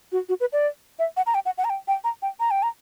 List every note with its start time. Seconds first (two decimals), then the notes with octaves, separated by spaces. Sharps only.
0.12 F#4
0.29 F#4
0.40 B4
0.53 D5
0.99 E5
1.17 F#5
1.26 A#5
1.34 G5
1.46 F#5
1.58 F#5
1.64 A#5
1.70 G5
1.88 G5
2.04 A#5
2.22 G5
2.40 A#5
2.51 G5
2.63 A#5